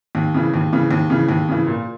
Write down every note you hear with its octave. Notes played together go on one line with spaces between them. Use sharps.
D#2
C#3 E3
D#2
C#3 E3
D#2
C#3 E3
D#2
C#3 E3
A#2